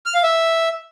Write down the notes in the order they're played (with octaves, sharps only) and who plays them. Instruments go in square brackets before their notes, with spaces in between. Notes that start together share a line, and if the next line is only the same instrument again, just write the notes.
[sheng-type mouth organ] F6
F5
E5